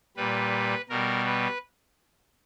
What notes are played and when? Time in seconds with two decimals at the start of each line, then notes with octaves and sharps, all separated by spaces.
0.17 A#2 G3 B4
0.89 B2 G3 A#4
1.26 B4